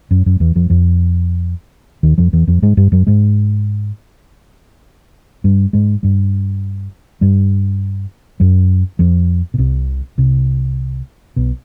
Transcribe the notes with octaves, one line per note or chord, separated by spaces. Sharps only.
F#2 F#3
F#2 F#3
E2 E3
F2 F3
F2 F3
D#2 D#3
F2 F3
E2 E3
F2 F3
G#2 G#3
G2 G3
F#2 F#3
G#2 G#3
G2 G3
G#2 G#3
G2 G3
G2 G3
F#2 F#3
F2 F3
B2
C2 C3
C2 C3
B1 B2